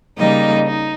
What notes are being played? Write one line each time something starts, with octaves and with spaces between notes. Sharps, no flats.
C#3 G3 A#3 D#4 D#5
D#4